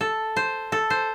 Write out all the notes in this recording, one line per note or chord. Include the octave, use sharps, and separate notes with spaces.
A4
C5
A4
C5